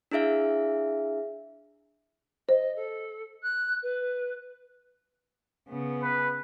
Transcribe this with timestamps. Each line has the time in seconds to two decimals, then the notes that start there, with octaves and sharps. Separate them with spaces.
0.11 D4 E4 G#4 E5 F5
2.49 C5 D#5
2.76 A4
3.42 F#6
3.82 B4
5.68 C#3 B3
6.02 B4